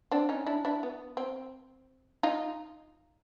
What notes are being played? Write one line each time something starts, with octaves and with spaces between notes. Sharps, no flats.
C4 D4
C#4 D#4
D4 E4
D4 E4
B3
C4
D#4 F4